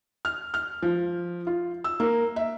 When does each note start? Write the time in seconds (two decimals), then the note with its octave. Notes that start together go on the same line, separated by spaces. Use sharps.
0.25 F6
0.54 F6
0.82 F3
1.47 F4
1.84 E6
2.00 A#3
2.36 E5